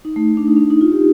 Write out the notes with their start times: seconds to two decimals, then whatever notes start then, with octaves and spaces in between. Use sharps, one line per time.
0.05 D#4
0.16 A3
0.37 D4
0.48 D#4
0.56 D4
0.70 D#4
0.81 F4
0.92 G4